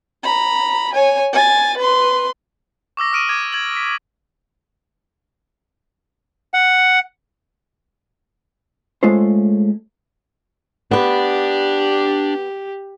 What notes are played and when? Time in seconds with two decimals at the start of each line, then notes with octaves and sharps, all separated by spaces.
0.23 A#5 B5
0.93 C#5 G#5
1.33 G#5 A6
1.77 B4 C6
2.97 C#6 D6 E6 A#6
3.12 D#6 F6 D7 D#7
3.29 D6 G#6
3.53 G#6 F#7
3.77 B6
6.54 F#5
9.03 G#3 A3 C#4 F4 C5
10.91 B3 D4 G4 B4 D5